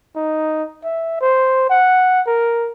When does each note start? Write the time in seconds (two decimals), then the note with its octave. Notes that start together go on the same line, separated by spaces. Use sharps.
0.16 D#4
0.84 E5
1.21 C5
1.70 F#5
2.27 A#4